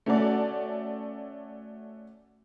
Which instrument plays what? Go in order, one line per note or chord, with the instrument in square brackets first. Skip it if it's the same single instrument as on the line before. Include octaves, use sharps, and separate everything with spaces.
[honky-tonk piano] A3 C#4 F#4 A4 D5